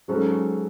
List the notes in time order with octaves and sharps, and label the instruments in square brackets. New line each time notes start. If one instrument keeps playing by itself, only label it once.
[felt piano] G#2 F#3 C#4 F#4 A4